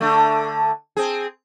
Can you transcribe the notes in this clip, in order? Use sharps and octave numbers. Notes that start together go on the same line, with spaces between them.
D3 A3
C4 G#4